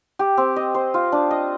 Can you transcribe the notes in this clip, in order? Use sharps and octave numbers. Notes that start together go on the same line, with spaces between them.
G4
C4
D#5
C5
F4
D4
D#5